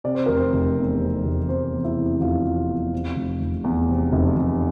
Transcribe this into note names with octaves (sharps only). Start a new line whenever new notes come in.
C3 D5
C5
F1 A#4
C4 C5
F1
E2
C3
F1
F1 C4 C5
E2
E4 E5
C3
F1 F4 F5
F1
E2
C3
F1
F1
E2
C3
F1
F1